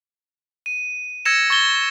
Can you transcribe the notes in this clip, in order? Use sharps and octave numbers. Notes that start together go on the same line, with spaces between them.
D#7
E6 G#6 A#6 C#7 E7
C#6 G#6 A6 G7